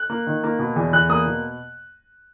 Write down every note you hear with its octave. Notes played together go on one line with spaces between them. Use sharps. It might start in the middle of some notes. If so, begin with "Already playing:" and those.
Already playing: F#6
A#3
D#3
A#3
B2
E2
E2 F#6
A#3 D#6
B2